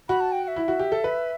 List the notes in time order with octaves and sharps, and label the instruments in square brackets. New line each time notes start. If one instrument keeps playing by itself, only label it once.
[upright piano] F#4 [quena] B5
[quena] A5
G5
G5
E5
[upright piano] E4
F#4
G4
A4
B4